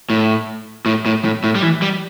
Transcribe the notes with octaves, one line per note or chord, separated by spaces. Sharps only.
A2
A2
A2
A2
A2
G3
E3
G3